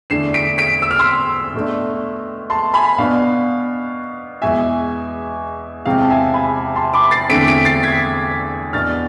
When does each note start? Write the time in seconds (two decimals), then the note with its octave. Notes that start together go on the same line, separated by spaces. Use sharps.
0.10 E2 D3 A3 D4 C7 E7
0.34 B6 D7
0.58 B6 D7
0.82 E6
0.91 F6
0.99 C6 E6
1.54 B2 A3 D4
2.50 A5 C6
2.74 G#5 B5
2.98 B2 B3 D4 F5
4.42 E2 B2 G#3 E5 G#5
5.85 E2 C3 G#3 C4 F5
6.01 A5
6.10 E5 G#5
6.34 G#5 B5
6.75 A5 C6
6.93 B5 D6
7.11 A6 C7
7.29 E2 D3 A3 C4 B6 D7
7.47 B6 D7
7.65 A6 C7
7.83 G#6 B6
8.73 E2 B2 B3 D4 F6 A6